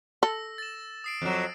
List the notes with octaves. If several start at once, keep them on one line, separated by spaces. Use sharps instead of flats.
A4 E6 A#6
A6 E7
D#6 C7 D7
F2 F#3